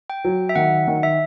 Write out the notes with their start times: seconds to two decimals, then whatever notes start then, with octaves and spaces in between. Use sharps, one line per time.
0.10 G5
0.24 F#3
0.49 E5
0.56 D#3 F#5
0.87 D#3
1.03 E5